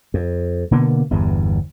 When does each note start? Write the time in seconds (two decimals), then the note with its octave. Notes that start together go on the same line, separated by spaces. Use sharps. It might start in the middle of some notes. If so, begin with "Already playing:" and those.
0.14 F2
0.71 B2 D3 A#3 B3
1.11 G1 E2 G2